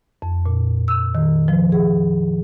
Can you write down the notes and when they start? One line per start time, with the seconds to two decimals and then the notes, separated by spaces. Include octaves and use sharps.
0.22 F2
0.46 A#2
0.88 E6
1.15 D#3
1.48 F3
1.72 G#4